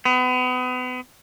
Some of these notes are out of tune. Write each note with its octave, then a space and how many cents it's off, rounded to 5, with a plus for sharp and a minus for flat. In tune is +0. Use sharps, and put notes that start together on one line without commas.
B3 +35